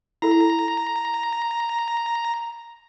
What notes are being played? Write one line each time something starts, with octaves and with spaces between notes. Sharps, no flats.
E4 A4 A#5